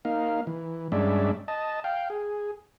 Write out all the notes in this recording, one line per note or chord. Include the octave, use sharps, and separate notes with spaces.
A#3 D#4 F5
E3
G2 G#3 C#4 D4 D5 E5
D#5 A5
F5 G5
G#4